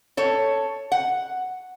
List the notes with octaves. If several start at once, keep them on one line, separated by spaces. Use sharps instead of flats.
A4 C#5
F#5